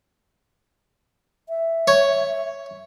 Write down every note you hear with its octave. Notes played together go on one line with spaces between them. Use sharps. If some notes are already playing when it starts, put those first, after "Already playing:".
E5
C#5